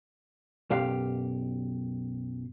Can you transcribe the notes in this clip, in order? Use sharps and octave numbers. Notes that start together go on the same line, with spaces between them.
B1 F#2 G4 F5